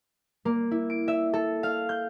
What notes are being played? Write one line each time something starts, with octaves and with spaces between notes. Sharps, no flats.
A#3
E4
D7
E5
A4
F5
G6